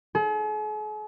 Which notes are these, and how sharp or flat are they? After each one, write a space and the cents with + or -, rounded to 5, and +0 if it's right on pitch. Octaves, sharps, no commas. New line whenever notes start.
G#4 +45